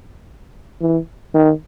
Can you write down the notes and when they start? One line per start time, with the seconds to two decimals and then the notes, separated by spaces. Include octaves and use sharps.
0.81 E3
1.35 D#3